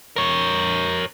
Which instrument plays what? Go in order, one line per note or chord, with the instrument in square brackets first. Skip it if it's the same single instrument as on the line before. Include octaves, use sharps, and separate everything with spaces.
[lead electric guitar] A#4 C#5